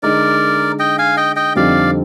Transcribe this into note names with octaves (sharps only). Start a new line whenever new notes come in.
D3 G#3 D#4 A#4 D5
D#5 G5
F5 G#5
D#5 G5
D#5 G5
F2 D3 G3 C4 D#4 D5 F5